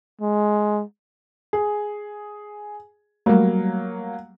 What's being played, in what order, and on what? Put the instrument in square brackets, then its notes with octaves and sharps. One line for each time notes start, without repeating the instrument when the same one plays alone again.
[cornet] G#3
[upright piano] G#4
[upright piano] F#3 A#3 [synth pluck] G3 A3